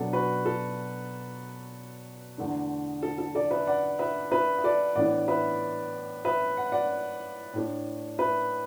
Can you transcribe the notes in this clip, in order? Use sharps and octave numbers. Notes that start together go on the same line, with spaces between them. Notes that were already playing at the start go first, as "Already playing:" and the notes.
Already playing: B2 F#3 B3 D4 A4
F#4 B4
A4
E2 D3 A3 D4
A4
A4
A4 D5
B4 E5
D5 F#5
B4 E5
B4 E5
E5
A4 D5
A2 E3 B3 D4 D5 F#5
B4 E5
B4 E5
F#5
D5 F#5
A2 A3 D4
B4 E5